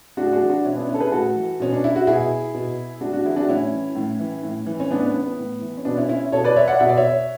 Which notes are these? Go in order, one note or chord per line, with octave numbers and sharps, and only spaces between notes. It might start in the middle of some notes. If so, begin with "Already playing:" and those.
A2 D4 F#4
G#4
D4 F#4
E3
D4 F#4
B2 C#4 E4
B3 D4
C#4 E4
A4
G#4 B4
A2 F#4 A4
E3
B2 C#4
D4
E4
F#4
B2 E4 G#4
B2
A2 D4 F#4
D4 F#4
E3 E4 G#4
D4 F#4
A2 C#4 E4
E3
A2
E3
A2
E3
C#4
A2 B3 D4
C#4
B3
E3
B3
A2
E3
C#4
B2 B3 D4
C#4 E4
C#4 E4
B2 A4 C#5
B4 D5
C#5 E5
D5 F#5
B2 E5
D5
C#5 E5